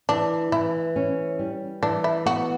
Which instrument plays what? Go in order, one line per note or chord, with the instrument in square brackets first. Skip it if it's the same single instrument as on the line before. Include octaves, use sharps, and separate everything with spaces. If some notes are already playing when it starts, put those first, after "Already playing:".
[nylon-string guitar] E3 [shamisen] D4
[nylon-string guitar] E3 [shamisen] E4
[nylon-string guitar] C#4
G3
[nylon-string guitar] E3 [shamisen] D4
[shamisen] E4
[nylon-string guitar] B3 [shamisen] F#4